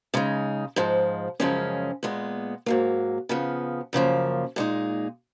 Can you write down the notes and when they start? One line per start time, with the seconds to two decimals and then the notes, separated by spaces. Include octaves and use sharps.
0.14 C#3 G#3 D#4
0.76 G#2 F3 G#3
1.40 F#2 C#3 F3 G#3 C#4
2.03 A#2 G#3 B3
2.66 G#2 F#3 A#3
3.29 C#3 F3 B3
3.93 F#2 C#3 F3 A#3
4.56 A#2 G#3 D#4